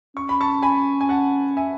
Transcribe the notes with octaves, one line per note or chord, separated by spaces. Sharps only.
C#4 C#6
B5
A5 C#6
G#5 B5
G#5
F#5 A5
E5 G#5